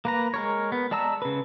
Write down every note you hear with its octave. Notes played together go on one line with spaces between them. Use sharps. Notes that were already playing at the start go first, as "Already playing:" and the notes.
A#3 B4 A#5
G#3 A#4 C#5
B3
G#3 D5 A5 A#5 E6
C#3 B4